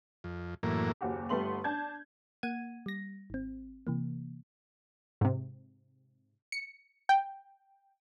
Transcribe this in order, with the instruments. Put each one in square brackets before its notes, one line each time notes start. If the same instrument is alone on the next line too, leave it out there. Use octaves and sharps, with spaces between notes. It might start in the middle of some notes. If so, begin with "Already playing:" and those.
[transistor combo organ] F2
F#2 A2 E3 A#3
[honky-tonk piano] F#1 D#2 F#4 G4
G1 G3 A3 B3 C6 F#7
D4 A5 G6 G#6
[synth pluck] A#3 F#5 G#6 D#7
G3 A#6
G#1 C4
C3 E3 A#3
[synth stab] G#2 C3
C#7
G5